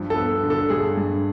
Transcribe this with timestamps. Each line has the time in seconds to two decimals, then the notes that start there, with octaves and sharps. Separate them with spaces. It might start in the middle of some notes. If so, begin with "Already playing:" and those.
Already playing: G2 F3
0.10 A4
0.16 B3
0.43 D3
0.50 A4
0.70 G2 G#4
0.97 G2